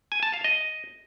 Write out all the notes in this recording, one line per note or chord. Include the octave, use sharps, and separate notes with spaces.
G#5
A5
F5
D#5